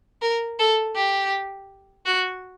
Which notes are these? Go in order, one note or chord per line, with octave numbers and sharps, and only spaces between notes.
A#4
A4
G4
F#4